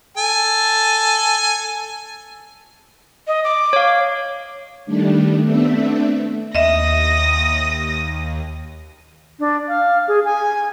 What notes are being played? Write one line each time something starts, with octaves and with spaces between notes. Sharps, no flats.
A4 G#5
D#5
D6
C#5 F5
D#3 G3 A3 D4
A3 B3 C4 D4 E5
D#2 D#5 E5 D#6 A#6
D4
F5
G#4
G#5